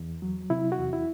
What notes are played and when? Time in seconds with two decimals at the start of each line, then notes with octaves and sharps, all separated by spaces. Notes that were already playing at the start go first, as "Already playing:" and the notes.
Already playing: E2
0.22 F#3
0.50 C3 E4
0.72 F#4
0.79 E2
0.93 E4